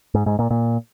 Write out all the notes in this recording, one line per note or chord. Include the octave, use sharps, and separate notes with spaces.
G#2
G#2
A#2
A#2